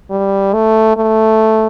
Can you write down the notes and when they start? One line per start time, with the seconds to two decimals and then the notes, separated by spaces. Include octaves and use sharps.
0.11 G3
0.54 A3
0.97 A3